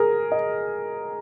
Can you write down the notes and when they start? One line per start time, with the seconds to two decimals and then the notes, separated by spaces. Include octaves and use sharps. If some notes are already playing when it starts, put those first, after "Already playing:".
Already playing: G#4 A#4
0.32 D#5